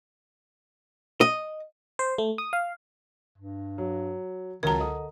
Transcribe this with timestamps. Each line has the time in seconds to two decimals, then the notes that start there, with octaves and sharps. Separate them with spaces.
1.21 D#5
1.99 C5
2.18 A3
2.38 D#6
2.53 F5
3.38 G2
3.78 F#3
4.63 C#2 D#3 F#3 A#4 A5 A#5
4.80 D3 D#5 D#6